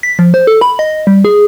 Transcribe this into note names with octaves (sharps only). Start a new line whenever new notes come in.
B6
F3
C5
A4
B5
D#5
G3
G#4